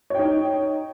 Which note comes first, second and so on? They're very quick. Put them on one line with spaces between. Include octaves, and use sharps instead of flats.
C#5 G5 D#4